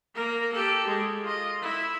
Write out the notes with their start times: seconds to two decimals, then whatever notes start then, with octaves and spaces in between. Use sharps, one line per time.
0.15 A#3 A#4
0.53 G4 A4
0.87 G#3
1.23 F4 D#5
1.62 E4